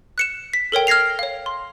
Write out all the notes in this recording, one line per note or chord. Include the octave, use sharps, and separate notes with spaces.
F#6 C#7 E7
B6
A4 A#4 C#5 G5
F6 G#6 A#6 C7 F7
C#5 F5
C6